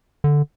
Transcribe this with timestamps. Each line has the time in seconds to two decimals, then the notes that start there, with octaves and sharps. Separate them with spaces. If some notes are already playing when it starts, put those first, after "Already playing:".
0.24 D3